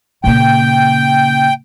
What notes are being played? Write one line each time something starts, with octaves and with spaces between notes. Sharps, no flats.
A#2 C#3 G5